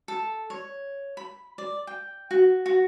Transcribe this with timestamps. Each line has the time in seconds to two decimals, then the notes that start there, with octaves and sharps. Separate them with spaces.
0.08 A4
0.50 C#5
1.17 B5
1.58 D5
1.87 G5
2.31 F#4
2.66 F#4